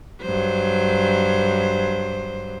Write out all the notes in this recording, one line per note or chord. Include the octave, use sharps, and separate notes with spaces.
G2 F#3 C5